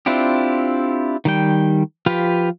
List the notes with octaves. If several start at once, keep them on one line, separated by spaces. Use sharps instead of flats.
C4 D4 E4 F4 G4
D#3 G3 G5
F3 F4 G4 B4 F5